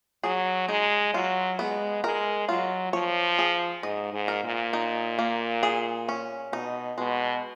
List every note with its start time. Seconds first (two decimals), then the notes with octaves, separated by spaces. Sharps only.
0.24 F#3 G#4
0.68 G#3 D#4
1.14 F#3 F4
1.59 G#3 B3
2.04 G#3 A#4
2.49 F#3 F4
2.93 F3 C#5
3.39 G#4
3.83 G#2 D#5
4.13 G#2
4.28 A#4
4.44 A#2
4.73 D#4
5.19 A#3
5.63 G#4
6.09 C#4
6.53 B2 D#4
6.98 B2 G#3